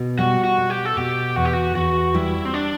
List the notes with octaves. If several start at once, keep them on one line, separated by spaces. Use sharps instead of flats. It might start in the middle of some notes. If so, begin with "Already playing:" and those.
Already playing: B2
G3 F#4
F#4
B2
G4
A4
B2 G4
E2 F#4
G4
F#4
E2 F#4
G3 E4
C4
D4